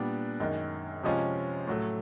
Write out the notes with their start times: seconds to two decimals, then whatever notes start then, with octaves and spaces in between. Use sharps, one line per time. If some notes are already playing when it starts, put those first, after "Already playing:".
Already playing: A#2 G3 B3 D4
0.40 F#2 D#3 G#3
1.03 C3 F3 G#3 C#4 F4
1.67 A2 F#3 A3